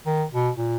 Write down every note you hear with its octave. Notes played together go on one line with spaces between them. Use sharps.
D#3
B2
A#2